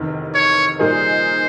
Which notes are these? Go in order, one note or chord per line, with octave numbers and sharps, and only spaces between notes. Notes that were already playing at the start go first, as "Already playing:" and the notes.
Already playing: F1 E2 C3 D#3
C#5
A#2 G3 A#3 D#4 G#4 C5